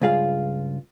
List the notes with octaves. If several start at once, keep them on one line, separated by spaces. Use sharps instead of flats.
C#2 G2 F4 G#4 F5